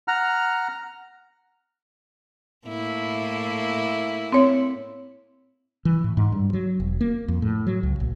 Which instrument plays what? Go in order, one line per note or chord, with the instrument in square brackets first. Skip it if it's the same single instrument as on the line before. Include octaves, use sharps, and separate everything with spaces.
[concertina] F#5 A#5 F6
[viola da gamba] A2 A#3 E4
[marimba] C4 C#5
[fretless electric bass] E3
A2
G#2
G2
F#3
E1
A#3
F2
A2
F#3
C#2
A#1